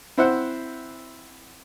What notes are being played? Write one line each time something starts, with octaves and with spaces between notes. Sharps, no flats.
C4 E4 C5 E5 F#5